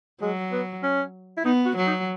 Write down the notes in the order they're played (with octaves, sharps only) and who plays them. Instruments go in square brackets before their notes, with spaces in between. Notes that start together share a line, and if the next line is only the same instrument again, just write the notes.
[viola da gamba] F#3 [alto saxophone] G#3
[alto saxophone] B3
C#4
E4
[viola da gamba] B3 [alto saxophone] D#4
[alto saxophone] F#4
[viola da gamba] F#3
[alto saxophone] D#4